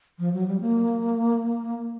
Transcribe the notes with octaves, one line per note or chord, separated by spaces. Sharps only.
F3
F#3
G3
A#3